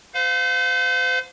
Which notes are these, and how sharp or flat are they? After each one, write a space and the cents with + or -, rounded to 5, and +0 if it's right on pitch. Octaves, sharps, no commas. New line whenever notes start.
C5 -40 F5 +20